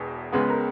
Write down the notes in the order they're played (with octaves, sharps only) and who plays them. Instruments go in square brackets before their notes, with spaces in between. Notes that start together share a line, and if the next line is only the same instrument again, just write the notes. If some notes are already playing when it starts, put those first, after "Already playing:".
Already playing: [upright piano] E1 E2 B2
C#2 C#3 G#3 B3 B4
A#4